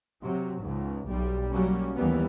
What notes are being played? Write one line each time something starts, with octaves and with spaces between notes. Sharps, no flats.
C3 F#3
C#2 G#2
B1 G3
F#3 G3 A#3 C#4
D#2 E3 G3 B3